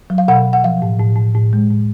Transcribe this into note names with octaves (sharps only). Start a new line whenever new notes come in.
F#3
F5
B2 F#5
B2
F#5
F3 F5
A2
A2
A2
A2
G#3
A2